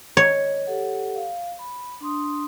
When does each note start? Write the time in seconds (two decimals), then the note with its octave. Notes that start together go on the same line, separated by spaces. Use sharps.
0.17 C#5 D#5
0.67 G4 A4 F#5
1.15 F5
1.59 B5
2.01 D4 C6 D#6